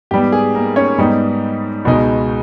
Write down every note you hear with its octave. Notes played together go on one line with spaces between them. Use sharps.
G#2 G3 B3 G4
G#4
A#3 A#4
C#4 C#5
G#2 G3 B3 D#4
C#2 B2 G#3 D#4